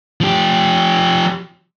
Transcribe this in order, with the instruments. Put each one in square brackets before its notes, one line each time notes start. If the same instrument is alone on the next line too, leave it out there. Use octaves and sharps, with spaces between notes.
[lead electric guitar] F3 G4